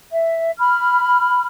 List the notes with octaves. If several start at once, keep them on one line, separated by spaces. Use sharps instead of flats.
E5
B5 F6